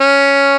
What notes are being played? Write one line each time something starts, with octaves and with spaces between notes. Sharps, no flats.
C#4